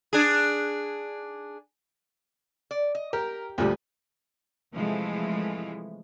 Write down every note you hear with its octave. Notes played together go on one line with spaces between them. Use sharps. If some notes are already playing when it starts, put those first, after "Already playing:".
D4 G#4
D5
D#5
G4 A#4
D2 A#2 F3 G3 B3
C3 E3 F3 G#3 A3